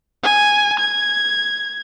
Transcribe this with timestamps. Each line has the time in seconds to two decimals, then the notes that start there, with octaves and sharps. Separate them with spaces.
0.23 G#5
0.79 G#6